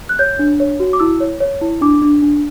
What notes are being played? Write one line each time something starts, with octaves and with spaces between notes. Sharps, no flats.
F#6
C#5 G6
D4
C#5
F#4
D6
E4 E6
C#5
C#5
E4
D4 D6
D4
D4